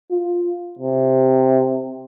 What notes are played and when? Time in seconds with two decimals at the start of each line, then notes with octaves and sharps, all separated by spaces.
0.11 F4
0.79 C3